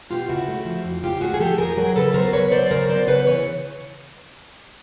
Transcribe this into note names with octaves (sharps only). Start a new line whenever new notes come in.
B2 F4 G4
C#3 E4 F#4
A3
F3
F2
C#3 F4 G4
A3 F#4 G#4
G#4
F3 G4 A4
F2 G#4 A#4
F#3 G#4 A#4
C#3 A4 B4
B3 A#4 C5
C#3 B4 C#5
F#3 C5 D5
C#3 A#4 C5
B3 C5 D5
C#3 B4 C#5
E3 B4 C#5